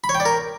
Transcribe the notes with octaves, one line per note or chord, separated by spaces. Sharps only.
B5
C#5
G5
D5
A#4